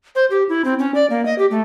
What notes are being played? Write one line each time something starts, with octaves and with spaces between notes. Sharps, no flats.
C5
G4
E4
C4
C#4
D5
A#3
D#5
G4
A3